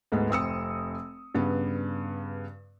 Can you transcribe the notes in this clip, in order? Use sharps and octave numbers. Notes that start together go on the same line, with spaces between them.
D2 G#2 B3
F1 C4 D#6 E6 C#7
G2 C#3 B3